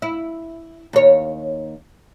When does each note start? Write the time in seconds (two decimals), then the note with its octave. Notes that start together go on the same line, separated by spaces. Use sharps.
0.02 E4
0.93 D#2 C#5